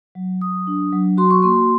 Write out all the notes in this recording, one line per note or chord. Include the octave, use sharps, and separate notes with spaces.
F#3
F#3 D#6
D4
F#3
F#4 C6
C#6
A#3 C6